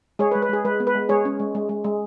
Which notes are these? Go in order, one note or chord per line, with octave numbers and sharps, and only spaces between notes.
G#3 G#4 C#5
B4
G#3
B4
G#3 G#4
G#3 B4
B3
B4
G#3
G#3 G#4 C#5
C#4
G#3
G#3
G#3
G#3